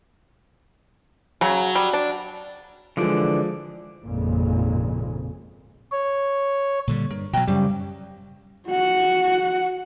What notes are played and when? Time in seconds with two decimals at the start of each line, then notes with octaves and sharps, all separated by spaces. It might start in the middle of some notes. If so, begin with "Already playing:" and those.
1.41 C#3 F#3
1.75 G3
1.93 D4
2.97 D3 E3 F3 G#3 D5
4.04 G#1 F2 A#2 C#3 G#3
5.92 C#5
6.87 A#2 D3 G3
7.11 G2 A#4
7.33 B2 F#3 D#5 G5 A#5
7.47 F#2 C#3 G3 C5
8.68 F#4 F#5